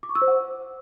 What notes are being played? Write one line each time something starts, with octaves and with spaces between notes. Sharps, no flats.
D6
C#6
E6
C5
F#5